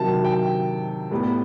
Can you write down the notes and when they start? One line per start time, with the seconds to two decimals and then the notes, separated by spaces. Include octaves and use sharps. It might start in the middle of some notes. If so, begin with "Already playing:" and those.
Already playing: C3 D#3 F#3 A5
0.25 G5
1.11 A2 G3 B3